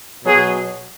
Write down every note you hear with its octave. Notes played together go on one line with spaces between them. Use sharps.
B2 F#3 G#4